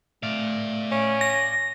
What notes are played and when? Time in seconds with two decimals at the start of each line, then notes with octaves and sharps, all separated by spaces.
0.23 A3 D5 F5
0.92 C#4
1.21 A#6